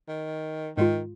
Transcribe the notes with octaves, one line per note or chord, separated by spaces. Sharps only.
D#3
G#2 D#3 G#3 F4